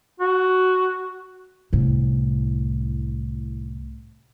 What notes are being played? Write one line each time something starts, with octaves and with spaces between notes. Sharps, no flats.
F#4
C2 A2